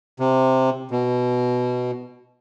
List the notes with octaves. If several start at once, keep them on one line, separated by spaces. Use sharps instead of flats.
C3
B2